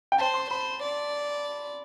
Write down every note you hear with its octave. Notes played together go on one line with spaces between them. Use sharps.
G5
C5 A5
C6
C5 B5
D5